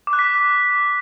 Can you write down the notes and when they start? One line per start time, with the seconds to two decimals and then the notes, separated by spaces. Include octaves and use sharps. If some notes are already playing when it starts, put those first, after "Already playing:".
0.07 D6
0.13 F#6
0.19 B6